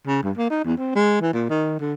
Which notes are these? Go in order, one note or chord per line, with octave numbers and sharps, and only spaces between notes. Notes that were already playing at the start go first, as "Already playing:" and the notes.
C#3
G2
A#3
D#4
E2
C4
G#3
E3
A#2
D#3
D3